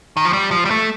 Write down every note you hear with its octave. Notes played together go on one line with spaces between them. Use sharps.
D#3
F3
G3
F3
G3
A3